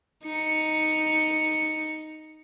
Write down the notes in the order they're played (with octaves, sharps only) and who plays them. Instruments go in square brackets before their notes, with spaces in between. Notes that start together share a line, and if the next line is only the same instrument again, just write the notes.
[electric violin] D#4 C#7